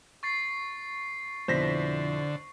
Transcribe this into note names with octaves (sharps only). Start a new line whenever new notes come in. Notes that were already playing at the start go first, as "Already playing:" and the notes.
C#6 A6 C7
F2 B2 D3 E4 C5 A#6 B6